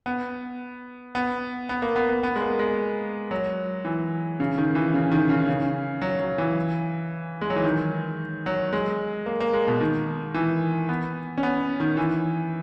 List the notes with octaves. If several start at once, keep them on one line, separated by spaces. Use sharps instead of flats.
B3
B3
B3
A#3
B3
B3
B3
G#3
A#3
G#3
F#3
E3
C#3
D#3
E3
C#3
D#3
C#3
C#3
F#3
F#3
E3
G#3
F#3
E3
D#3
F#3
G#3
A#3
A#3
G#3
B2
D#3
E3
B3
C#4
B3
D#3
E3